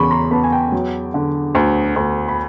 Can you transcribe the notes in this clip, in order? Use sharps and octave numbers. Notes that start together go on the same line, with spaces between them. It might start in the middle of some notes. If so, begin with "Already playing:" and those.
Already playing: E2 C#3 B5 C#6
A#5 C6
B3 A5 B5
G#5
G5 A5
F#3
D3
D2
D2
B5